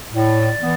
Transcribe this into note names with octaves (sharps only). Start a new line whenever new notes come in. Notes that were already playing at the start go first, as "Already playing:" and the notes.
A2 D5
E3 B3